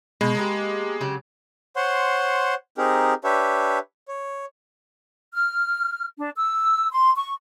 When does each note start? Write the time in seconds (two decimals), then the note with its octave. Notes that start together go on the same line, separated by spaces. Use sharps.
0.21 B2 G#3
0.35 A#3 B3 G4
1.01 C#3 F#3 G4
1.76 C5 C#5 F#5 C6
2.78 C4 D#4 G4 G#4 A#4
3.24 D4 G4 B4 C#5 E5
4.08 C#5
5.34 F6
6.18 D4
6.36 E6
6.92 C6
7.16 C#6